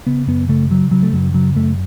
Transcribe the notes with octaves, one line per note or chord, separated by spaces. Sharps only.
C#3 B3
F#2 B3
C#3 A3
C#3 F#3
C#3 F#3
A3
F#2 F#3
C#3 F#3
F#2 A3